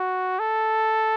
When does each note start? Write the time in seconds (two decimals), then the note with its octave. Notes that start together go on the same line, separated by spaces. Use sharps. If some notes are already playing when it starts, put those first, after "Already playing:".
Already playing: F#4
0.39 A4